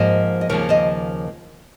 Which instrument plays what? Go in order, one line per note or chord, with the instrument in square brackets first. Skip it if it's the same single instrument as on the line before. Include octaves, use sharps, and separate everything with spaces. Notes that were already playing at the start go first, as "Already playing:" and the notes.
Already playing: [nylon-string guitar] G#2 F3 A#3 C5 D#5
D#5
D#2 C#3 F3 A#3 A#4 C#5
C5 D#5